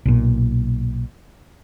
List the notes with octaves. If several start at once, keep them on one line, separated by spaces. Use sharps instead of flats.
B1 A#2